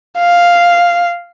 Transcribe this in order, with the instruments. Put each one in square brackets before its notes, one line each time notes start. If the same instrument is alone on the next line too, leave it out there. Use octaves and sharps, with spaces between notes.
[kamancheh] F5